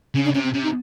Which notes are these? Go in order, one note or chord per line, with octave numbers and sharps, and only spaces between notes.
C#3 C#4
D4
C3 C#4
C4
C3 C#4
D#4